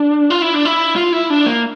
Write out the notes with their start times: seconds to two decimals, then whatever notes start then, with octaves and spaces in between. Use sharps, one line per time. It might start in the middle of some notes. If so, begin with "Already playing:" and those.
Already playing: D4
0.30 F4
0.42 E4
0.54 D4
0.65 E4
0.96 F4
1.13 E4
1.30 D4
1.46 A#3